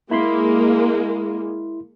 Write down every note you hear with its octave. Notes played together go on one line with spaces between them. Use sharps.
G#3 A#3 E4 B5 C6